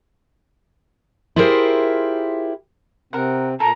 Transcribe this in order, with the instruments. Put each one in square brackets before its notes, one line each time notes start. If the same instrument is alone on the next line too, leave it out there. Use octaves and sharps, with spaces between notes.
[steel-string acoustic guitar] E4 F4 G4 G#4 A#4 C5
[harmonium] C3 C4 [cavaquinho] A#4 F#5
[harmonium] A#2 G#5 [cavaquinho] A4 [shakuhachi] A#5